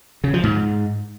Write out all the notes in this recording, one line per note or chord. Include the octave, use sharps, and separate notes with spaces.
C#3
F3
G#2